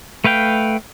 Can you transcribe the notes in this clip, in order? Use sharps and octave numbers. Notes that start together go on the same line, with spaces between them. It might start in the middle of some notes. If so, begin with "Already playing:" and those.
A3 B4 F5 G5